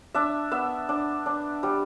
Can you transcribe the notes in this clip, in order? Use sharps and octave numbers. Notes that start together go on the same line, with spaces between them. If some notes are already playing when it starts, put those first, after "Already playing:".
D4 E5
B3 E5
D4
D4
G3